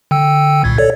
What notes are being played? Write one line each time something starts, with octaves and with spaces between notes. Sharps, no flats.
D3 G5 E6
C2 A#2 G#6
A4 C#5 D5